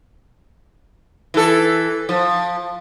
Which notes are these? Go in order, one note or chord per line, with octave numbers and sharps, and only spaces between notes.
E3 A4
F3